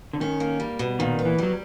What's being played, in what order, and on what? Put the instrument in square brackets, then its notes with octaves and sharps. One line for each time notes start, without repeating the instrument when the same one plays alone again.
[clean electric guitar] D3
[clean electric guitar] D#3 [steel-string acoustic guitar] C#4
[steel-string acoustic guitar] A#3
G3
B2
[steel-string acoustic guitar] A#2 [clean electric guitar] D#3
[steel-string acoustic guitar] B3
[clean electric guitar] E3
[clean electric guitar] F#3 [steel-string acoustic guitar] G3